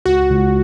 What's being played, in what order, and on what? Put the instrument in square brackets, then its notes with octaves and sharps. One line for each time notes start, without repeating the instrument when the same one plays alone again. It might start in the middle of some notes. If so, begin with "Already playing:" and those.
[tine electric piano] C#2 [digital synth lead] F#4
[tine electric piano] C#2